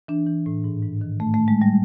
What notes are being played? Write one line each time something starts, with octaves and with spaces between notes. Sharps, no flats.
E3 D4
E3
A2
G#2
G#2
D#3
A2 A3
A3
A2
G#3
A2 G3